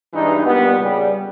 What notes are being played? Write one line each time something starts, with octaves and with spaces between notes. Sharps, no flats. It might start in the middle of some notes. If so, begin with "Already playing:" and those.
G2 E3 G#3 D#4
A#2 G3 B3
C#2 C#3 G3